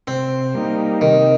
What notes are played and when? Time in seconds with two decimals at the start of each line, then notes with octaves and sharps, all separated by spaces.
0.07 C3 C4
0.54 G3 A#3 D#4
1.01 C3 D#3